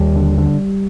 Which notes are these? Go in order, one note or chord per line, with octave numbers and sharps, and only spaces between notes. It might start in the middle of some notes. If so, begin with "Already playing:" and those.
Already playing: D#2 G3
D3
D3